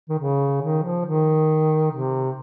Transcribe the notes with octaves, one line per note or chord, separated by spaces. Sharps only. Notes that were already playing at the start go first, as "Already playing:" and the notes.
D#3
C#3
D#3
F3
D#3
C3